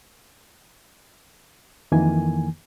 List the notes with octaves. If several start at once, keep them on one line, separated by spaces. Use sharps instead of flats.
F2 D#3 E3 A#3 G#5